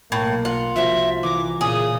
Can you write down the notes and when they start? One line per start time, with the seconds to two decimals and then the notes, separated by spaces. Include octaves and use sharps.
0.12 B1 A2 A#3
0.45 F4 F#5
0.76 C2 F3 F#4 E5
1.23 E3 A#5 D6
1.61 A#2 C#3 G#4 D#6